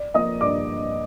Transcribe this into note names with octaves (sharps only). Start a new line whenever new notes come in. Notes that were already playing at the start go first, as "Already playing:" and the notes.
Already playing: D5
F3 A#3 D#5 D#6
G2 D5 D6